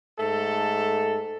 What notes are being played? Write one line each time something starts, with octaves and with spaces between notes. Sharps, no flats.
G#2 A3 A4